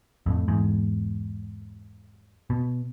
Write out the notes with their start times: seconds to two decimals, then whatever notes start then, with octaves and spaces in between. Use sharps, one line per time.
0.26 F2 A2
0.48 E2 G#2
2.50 B2